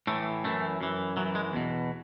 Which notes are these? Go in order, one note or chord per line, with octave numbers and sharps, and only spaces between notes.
A2 E3 A3
F#2 E3 A3
F#2 E3
F#2 E3 F#3
G#3
E2 B2